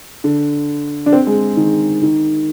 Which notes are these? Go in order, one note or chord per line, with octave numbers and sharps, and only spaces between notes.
D3
D4
C4
G#3
D#3
D#3